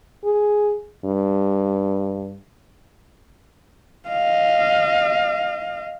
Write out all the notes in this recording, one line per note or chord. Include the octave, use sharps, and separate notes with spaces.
G#4
G2
D#5 F5